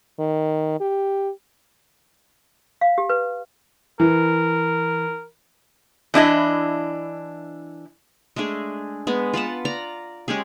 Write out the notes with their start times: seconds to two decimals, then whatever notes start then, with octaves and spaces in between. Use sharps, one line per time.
0.19 D#3
0.80 G4
2.81 F5
2.98 G4
3.10 B4
4.00 E3 A#4
6.14 E3 D4 E4 D#5
8.36 G#3 A3 D4 G#4
9.07 G#3 B3
9.34 F4 B4 F#5 A5
9.65 D5 A#5
10.28 G#3 C#4 G4 G#4